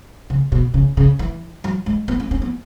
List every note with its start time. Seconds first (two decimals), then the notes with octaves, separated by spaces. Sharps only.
0.30 C#3
0.52 B2
0.74 C#3
0.97 C#3
1.19 E3
1.64 F#3
1.86 G#3
2.08 B3
2.20 C#4
2.31 C#4
2.42 B3